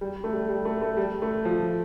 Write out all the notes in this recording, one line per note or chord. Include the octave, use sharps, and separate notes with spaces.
G3
A3
G3
G3
A3
A3
G3
A3
F3